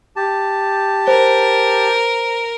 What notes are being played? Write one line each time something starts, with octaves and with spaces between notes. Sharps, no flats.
G4 A5
A#4 C5